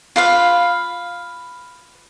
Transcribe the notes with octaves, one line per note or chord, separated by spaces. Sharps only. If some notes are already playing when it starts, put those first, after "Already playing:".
F4 B4 F5